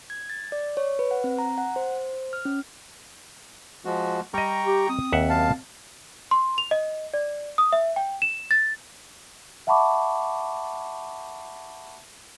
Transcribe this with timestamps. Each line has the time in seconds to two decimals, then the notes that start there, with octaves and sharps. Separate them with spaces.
0.10 G#6
0.30 A6
0.52 D5
0.77 C#5
0.99 B4
1.11 F#5
1.24 C4
1.39 A#5
1.58 F#5
1.76 C5
2.33 F6
2.45 C#4
3.85 F3 G#3 F#4
4.34 G3 D#5 G5 A#5 C#6
4.64 G4
4.89 C4 D#6
5.12 D#2 E5 F#5
5.29 F#2 F5 A5
6.31 C6
6.58 F7
6.71 D#5
7.14 D5
7.58 D#6
7.72 E5
7.96 G5
8.22 E7
8.51 A6
9.67 E5 F#5 A5 B5 C#6 D6